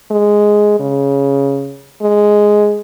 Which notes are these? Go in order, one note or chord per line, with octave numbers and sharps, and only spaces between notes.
G#3
C#3
G#3